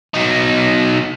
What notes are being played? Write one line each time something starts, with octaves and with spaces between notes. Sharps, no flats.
B2 D#4